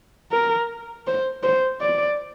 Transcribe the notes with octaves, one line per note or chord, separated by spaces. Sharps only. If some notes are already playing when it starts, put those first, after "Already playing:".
A#4
C5
C5
D5